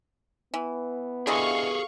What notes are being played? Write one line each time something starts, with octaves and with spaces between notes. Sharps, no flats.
E3 B3
D3 E3 G#4 A4 D#5 F5 C#6